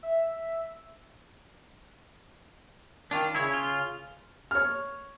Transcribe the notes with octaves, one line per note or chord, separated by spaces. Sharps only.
E5
D#3 D4 F4
C#3 E4 C#5
F4
C#5 F6